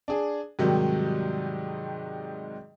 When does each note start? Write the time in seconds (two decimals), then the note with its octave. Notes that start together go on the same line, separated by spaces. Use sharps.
0.08 D4 G#4
0.59 G#2 C3 D#3 F#3 G3